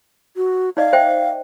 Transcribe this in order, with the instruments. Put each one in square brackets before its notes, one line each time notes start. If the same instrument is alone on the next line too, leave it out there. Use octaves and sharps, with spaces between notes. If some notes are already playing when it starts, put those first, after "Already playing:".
[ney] F#4
[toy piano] D#4 D5 D#5 [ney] F5
[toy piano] C5 E5 G5